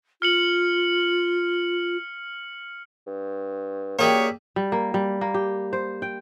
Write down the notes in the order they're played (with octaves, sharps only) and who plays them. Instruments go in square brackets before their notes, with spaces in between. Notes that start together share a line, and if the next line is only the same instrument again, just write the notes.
[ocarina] F4 [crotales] F6 C#7 F#7
[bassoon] G2
[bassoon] F#2 [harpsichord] A#3 G#4 [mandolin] G4 D5 E5 [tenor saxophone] C#5
[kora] G3
A#3
G3
A#3
G4
C5
G5